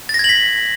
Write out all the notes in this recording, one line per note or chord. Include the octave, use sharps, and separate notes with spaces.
A6
A#6
G#6
F#7
B6